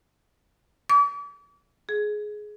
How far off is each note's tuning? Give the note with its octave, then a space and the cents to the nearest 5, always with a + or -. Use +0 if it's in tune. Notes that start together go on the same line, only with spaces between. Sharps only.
D6 -45
G#4 +15